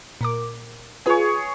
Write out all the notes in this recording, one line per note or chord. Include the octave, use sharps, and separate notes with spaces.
A#2 A#4 D6
F4 G#4 B4 C#5 G#5